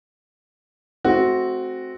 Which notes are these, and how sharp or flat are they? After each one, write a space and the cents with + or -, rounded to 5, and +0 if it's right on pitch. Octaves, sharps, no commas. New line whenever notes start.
A3 -35 C4 +0 F#4 +0